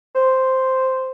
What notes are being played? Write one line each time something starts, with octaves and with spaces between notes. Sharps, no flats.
C5